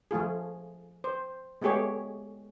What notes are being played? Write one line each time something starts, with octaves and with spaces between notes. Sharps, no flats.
F3 A3 F4 G#4
C5
G#3 A3 B3 G4 G#4 C#5